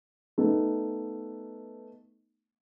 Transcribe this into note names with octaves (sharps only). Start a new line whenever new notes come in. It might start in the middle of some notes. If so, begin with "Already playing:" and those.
A3 B3 D#4